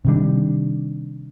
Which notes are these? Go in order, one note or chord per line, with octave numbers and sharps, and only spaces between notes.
C3 D#3 G3 D4